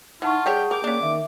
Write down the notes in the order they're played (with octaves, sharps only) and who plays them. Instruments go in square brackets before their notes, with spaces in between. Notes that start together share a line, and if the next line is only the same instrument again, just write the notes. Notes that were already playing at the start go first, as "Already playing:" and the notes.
[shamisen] E3 [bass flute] D#4 [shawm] F4 [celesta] F#5 A5 C#6
[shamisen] G3 G4 C#5 [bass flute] G#4 [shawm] G5
[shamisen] A#4 [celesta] G5 G6 [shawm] D6
[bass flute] A#3 [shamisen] C#4 D4
[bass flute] D#3 [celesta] E5